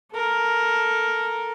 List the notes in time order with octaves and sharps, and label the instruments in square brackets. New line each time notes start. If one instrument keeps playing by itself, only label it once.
[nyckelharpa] A4 A#4